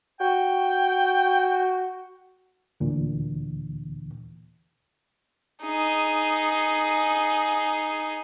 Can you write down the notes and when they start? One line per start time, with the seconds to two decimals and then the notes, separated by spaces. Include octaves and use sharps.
0.20 F#4 G5
2.80 D2 A#2 D3 E3
5.64 D#4 G#4